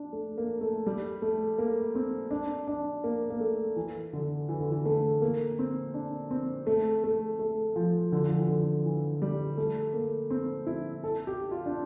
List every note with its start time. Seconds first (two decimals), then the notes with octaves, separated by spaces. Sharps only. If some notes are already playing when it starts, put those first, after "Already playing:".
Already playing: D4
0.13 A3
0.38 A#3
0.61 A3
0.87 G3
1.22 A3
1.58 A#3
1.95 C4
2.31 D4
2.68 D4
3.04 A#3
3.30 A#3
3.40 A3
3.76 E3
4.13 D3
4.49 E3
4.60 D3
4.72 E3
4.86 A3
5.22 A#3
5.59 C4
5.94 D4
6.31 C4
6.67 A3
7.04 A3
7.39 A3
7.76 F3
8.12 D3
8.25 F3
8.37 E3
8.48 D3
8.85 E3
9.22 G3
9.57 A3
9.94 A#3
10.31 C4
10.67 E4
11.04 A4
11.27 G4
11.51 F4
11.66 D4